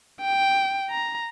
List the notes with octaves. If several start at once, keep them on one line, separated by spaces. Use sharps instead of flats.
G5
A#5